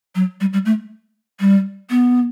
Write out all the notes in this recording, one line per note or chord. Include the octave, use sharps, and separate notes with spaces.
F#3
G3
G3
A3
G3
B3